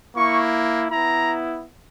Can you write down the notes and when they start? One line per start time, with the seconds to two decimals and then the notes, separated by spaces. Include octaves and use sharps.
0.16 A#3 E4 C#6
0.91 B3 E4 A#5